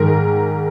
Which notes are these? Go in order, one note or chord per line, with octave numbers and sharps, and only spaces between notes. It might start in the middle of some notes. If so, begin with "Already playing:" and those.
Already playing: G#2 D#3 A#4